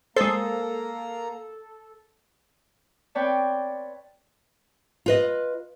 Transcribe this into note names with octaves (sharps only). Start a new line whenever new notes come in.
G#3 A#3 A4 C5 A#5
C4 B4 C#5 D5 G5 A5
F4 B4 D#5